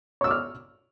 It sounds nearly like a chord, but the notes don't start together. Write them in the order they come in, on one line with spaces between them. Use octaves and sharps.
C#5 E6 D6 F6